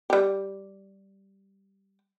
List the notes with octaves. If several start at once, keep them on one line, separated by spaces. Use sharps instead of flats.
G3 G4